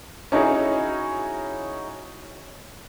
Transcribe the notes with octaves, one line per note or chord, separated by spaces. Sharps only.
C#4 D#4 E4 F#4 G#4 C#5